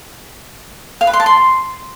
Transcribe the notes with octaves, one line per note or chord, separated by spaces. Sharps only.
F5
B4
C6
A5
C6